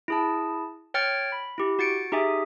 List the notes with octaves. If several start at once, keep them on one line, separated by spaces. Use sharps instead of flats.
E4 G#4 A5
C#5 G5 F6 A6 C#7
B5
E4 G4
F#4 A6 C#7 D7
D#4 G4 G#4 E5 G#5